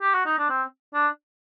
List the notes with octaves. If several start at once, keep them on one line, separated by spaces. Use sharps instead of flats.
G4
F#4
D#4
D4
C4
D4